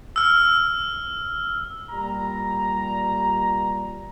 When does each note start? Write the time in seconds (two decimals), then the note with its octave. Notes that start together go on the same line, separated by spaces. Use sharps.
0.16 E6 F6
1.91 A#2 G3 A#5